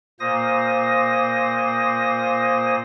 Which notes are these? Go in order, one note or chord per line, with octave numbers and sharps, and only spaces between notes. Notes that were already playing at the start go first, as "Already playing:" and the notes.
A#2 A#3 C5 D#6 A#6